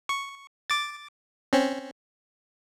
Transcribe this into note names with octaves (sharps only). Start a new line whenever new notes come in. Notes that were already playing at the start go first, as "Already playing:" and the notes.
C#6
D6 A6
C4 C#4